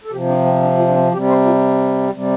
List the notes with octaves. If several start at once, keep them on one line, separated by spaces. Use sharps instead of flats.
A4
C3 F3 G4
D4
C4
D4
F4
D4
C4
C3 G3 G4
C5
F4
C3 G3